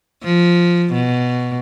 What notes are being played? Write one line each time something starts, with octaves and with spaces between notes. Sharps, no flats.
F3
B2